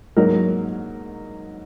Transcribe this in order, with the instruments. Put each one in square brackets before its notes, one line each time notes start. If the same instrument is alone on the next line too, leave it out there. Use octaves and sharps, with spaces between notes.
[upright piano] G#2 F#3 A#3 D#4 A#4